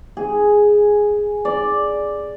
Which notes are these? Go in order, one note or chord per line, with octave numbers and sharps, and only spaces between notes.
G#4
D5